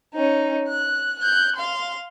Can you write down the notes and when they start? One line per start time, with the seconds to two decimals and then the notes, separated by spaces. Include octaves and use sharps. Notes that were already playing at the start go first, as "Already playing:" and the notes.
0.14 C#4 D#4
0.68 F#6
1.19 F#6 G6
1.55 F5 C6